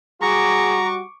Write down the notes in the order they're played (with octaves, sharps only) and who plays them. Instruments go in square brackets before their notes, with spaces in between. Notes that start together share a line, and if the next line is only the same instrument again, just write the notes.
[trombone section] G3 F#4 [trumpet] G#4 [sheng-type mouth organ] A#5 [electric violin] C#6 D6